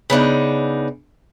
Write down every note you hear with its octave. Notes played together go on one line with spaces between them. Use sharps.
C#3 B3 D4 D#4